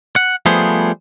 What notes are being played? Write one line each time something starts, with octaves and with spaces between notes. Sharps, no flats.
F#5
F3 G3 A3 B3 G#4 C5